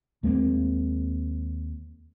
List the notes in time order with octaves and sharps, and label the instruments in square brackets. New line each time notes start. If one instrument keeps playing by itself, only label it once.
[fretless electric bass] D#2 G#3 A#3 C4